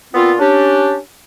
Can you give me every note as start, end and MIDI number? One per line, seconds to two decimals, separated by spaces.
0.14 0.33 46
0.14 0.33 59
0.14 0.33 60
0.14 0.33 65
0.39 0.97 61
0.39 0.97 62
0.39 0.97 67